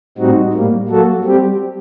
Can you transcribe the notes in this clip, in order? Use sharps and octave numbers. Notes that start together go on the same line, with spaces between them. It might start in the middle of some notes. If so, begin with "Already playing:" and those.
A2 G3 C4 D#4 F#4
A2 G3 A#3
F#3 A#3 F#4 A4
G3 C4 G4